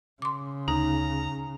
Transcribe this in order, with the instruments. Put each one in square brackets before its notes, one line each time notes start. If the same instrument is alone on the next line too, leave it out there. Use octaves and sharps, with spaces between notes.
[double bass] C#3 [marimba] C6 D6
[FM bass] D2 [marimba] D#4 [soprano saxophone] A#5